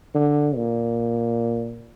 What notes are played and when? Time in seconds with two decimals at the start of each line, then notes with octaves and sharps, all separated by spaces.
0.15 D3
0.56 A#2